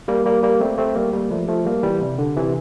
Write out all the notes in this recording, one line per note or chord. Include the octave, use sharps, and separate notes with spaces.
G3 A#3
G3 A#3
G3 A#3
A3 C4
A3 C4
G3 A#3
G3 A#3
F3 A3
F3 A3
G3 A#3
E3 G3
C3
D3
C3 E3